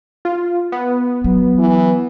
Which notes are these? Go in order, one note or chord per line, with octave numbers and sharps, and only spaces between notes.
F4
B3
F#3
E3